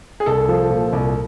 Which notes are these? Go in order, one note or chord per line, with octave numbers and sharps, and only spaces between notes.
G#4
C2 A4
F3
A#2
C2